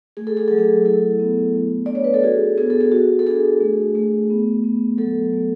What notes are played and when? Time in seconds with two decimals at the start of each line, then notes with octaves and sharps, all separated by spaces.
0.17 A3 G#4
0.27 A4
0.37 G#4
0.48 F#3 A4
0.58 G#4
0.85 E4 A4
1.20 B3
1.55 A3
1.86 D4 D5
1.95 C#5
2.04 B4
2.14 A4
2.23 F#4 G#4
2.58 B3 G#4
2.70 A4
2.81 G#4
2.92 F#4
3.19 A4
3.26 D4 G#4
3.60 A3
3.95 A3
4.30 B3
4.64 B3
4.98 F#3 A4
5.33 A3